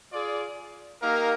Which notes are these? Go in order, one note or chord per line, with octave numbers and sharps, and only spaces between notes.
F4 G#4 D5
A#3 D#4 G4 A#4 F5